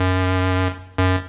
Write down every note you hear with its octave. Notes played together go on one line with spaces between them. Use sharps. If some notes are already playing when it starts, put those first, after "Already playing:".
Already playing: F#2
F#2